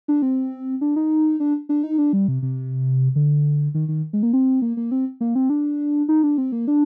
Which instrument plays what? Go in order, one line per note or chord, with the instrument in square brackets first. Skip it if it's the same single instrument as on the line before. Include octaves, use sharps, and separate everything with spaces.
[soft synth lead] D4
C4
D4
D#4
D4
D4
D#4
D4
G3
C3
C3
D3
D#3
D#3
G#3
A#3
C4
A#3
A#3
C4
A#3
C4
D4
D#4
D4
C4
A#3
D4